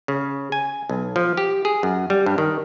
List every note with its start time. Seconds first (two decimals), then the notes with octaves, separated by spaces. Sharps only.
0.08 C#3
0.52 G#5
0.89 B1
1.16 F3
1.37 G4
1.65 G#4
1.83 F#2
2.10 G3
2.26 G2
2.38 D#3